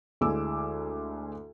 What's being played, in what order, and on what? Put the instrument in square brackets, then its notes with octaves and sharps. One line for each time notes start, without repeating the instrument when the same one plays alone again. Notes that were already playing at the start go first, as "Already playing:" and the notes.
[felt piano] D2 G#3 E4 G#5 D6 E6